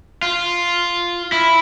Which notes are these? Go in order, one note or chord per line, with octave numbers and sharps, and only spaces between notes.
F4
E4